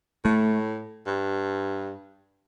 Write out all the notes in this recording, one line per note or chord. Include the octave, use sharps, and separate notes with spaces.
A2 A3
G2